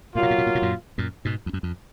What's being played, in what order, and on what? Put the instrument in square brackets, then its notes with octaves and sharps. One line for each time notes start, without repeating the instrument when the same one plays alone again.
[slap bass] A#2 [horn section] F#3 A#3 F4
[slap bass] B2
A#2
B2
A#2
B2
F#2 A#2
F#2 A#2
G#2 B2
F2
F#2
F2